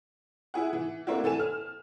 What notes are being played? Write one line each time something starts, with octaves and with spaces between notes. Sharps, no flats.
E4 G#4 F#5
E3
A3 A#3 C4 D4 E4 F#4
E3 A4 G#5 E7
F6